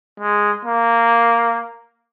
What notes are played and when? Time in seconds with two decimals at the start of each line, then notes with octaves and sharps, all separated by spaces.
0.20 G#3
0.65 A#3